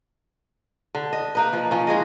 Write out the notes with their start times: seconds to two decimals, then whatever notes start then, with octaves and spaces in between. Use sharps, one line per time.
0.95 D3
1.13 D#5
1.35 A#3 D#4 B4
1.53 F3
1.71 F3 C#4
1.87 E3 G#3 G#4 D#5